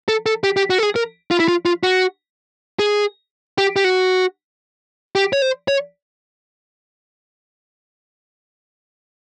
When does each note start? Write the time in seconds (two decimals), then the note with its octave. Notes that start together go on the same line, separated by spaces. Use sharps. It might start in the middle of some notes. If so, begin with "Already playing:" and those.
0.08 A4
0.26 A4
0.44 G4
0.57 G4
0.70 F#4
0.79 A4
0.83 G#4
0.96 A#4
1.31 F4
1.40 E4
1.48 F4
1.66 F4
1.83 F#4
2.79 G#4
3.58 G4
3.76 G4
3.84 F#4
5.16 G4
5.33 C#5
5.42 C5
5.68 C#5